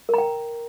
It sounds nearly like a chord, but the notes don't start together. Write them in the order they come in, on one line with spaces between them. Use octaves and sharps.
A#4 A#5 G5